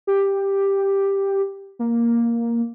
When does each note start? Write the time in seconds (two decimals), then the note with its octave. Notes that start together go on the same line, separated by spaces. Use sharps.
0.07 G4
1.79 A#3